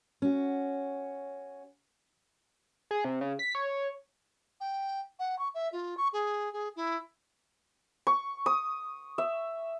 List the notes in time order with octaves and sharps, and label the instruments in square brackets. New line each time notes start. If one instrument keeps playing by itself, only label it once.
[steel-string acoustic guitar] C#4 F#4
[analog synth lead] G#4
C3
C#3
B6
C#5
[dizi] G5
F#5
C#6
E5
F4
C#6
G#4
G#4
E4
[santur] C#6
D#6
E5